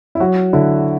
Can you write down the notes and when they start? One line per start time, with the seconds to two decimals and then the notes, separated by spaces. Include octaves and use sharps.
0.15 E4
0.20 F#3 F#4
0.53 D3 E4